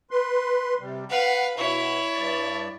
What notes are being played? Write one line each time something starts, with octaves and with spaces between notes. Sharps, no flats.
B4 C6
C3 G3
B4 F5 F#5
B2 E4 C#5
G2 D5